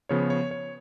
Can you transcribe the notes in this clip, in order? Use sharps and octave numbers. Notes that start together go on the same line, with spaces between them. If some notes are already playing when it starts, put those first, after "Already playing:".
C#3 F3 B3 C#5
C#5
C#5